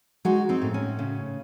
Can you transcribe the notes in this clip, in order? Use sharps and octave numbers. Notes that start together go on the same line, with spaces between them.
G#3 D#4 F#4
C4 D#4
A2
C#4
C#3